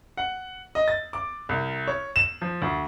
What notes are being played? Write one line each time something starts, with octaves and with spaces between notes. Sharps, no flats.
F#5
D#5
A6
D6
C2
C#5
E7
F3
D2